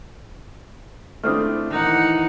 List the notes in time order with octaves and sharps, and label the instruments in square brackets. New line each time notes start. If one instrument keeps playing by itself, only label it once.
[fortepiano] A3 C4 D4 [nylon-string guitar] E4 F4 [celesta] D#6 F6
[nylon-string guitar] D#3 E3 [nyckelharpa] D#4 F#5